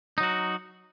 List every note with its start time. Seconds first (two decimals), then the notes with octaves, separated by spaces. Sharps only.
0.18 D#4
0.20 F#3
0.23 F#4